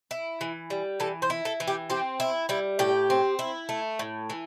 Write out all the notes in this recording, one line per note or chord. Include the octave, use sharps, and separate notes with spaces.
E4
E3
G3
E3 A4
C5
E4
A4
E3
G4
C4 G4
E4
G3 E4
A2 G4
C4
E4
A3
A2
E3